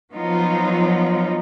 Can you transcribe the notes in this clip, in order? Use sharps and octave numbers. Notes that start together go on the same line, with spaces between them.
F3 F#3 B3 D#4 F4